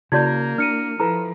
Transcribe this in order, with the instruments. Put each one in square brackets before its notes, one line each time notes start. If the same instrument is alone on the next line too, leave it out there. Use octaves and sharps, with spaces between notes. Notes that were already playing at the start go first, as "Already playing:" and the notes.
[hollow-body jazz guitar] C#3 [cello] A#3 A#4 [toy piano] E4 F#4 D5 [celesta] G6 G#6
[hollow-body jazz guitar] D4 [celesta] F6 C#7 D#7
[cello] F3 [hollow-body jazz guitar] E4 A4 B4 [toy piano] A#5